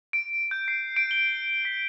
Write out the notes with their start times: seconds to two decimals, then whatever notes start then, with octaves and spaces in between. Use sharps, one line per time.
0.13 D7
0.51 G6
0.68 C7
0.96 D7
1.11 G7
1.65 B6